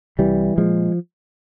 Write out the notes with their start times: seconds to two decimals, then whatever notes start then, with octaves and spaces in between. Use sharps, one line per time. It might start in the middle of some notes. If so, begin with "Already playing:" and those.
0.19 C2 E3 G3
0.57 A#2 F3 G#3